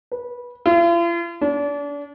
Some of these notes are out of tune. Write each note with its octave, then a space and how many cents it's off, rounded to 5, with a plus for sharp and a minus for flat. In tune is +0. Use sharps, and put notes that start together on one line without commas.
B4 -20
F4 -45
D4 -35